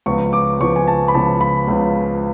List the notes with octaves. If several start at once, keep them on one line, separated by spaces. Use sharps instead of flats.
C#2 C#3 F3 B3 C#6
D6
C#2 C#3 F3 B3 C#6
G#5
A5
B5
C#2 C#3 F3 B3 A5
B5
C#2 C#3 F3 B3